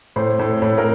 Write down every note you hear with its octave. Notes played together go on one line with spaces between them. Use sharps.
A2 C5
A2
A2
A#4